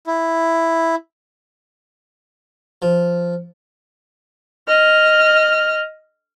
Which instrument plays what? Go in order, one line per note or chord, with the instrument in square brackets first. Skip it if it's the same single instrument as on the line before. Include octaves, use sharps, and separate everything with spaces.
[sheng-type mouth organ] E4
[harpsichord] F3
[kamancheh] D#5 F6